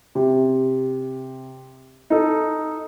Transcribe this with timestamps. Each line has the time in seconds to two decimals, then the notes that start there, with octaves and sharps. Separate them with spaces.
0.15 C3
2.10 D#4 A4